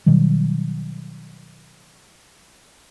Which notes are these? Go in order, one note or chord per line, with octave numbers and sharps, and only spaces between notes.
B2 D#3 F#3 G3